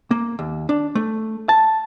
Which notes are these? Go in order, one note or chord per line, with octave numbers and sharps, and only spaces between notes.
A#3
D#2
D4
A3
A5